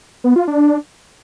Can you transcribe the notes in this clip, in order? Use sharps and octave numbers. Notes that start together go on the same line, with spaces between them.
B3
F4
D4